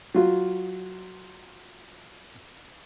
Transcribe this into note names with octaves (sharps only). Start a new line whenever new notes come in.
F#3 F4